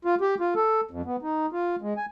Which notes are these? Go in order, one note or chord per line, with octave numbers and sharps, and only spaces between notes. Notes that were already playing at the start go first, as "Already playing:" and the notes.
F4
G4
F4
A4
F2
B3
D#4
F4
G#3
G#5